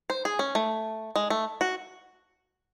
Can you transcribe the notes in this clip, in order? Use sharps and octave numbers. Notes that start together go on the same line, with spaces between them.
C5
G#4
C#4
A3
G#3
A3
F#4